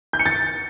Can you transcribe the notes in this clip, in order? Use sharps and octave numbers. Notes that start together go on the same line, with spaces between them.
G6
C#7
A6